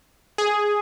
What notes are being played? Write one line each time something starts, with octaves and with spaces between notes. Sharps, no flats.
G#4